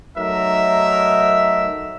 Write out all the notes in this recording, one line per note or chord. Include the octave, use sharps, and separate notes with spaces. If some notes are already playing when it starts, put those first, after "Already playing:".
F#3 A3 D#4 A#4 E5